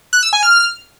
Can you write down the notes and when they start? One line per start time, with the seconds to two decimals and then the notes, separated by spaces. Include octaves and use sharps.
0.13 F#6
0.23 E6
0.33 G#5
0.43 F6